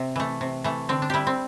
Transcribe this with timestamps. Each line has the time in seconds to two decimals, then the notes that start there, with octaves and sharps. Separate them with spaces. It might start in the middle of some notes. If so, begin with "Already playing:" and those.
Already playing: C3
0.16 E3 A3
0.41 C3
0.64 E3 A3
0.89 D3 C4
1.02 D4
1.10 G3 E4 G4
1.27 C4